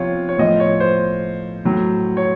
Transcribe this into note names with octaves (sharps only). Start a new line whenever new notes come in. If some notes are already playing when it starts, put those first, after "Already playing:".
Already playing: C3 F3 F4 C#5
C#5
A2 F3 D#5
C#5
C5
A2 F#3
C#5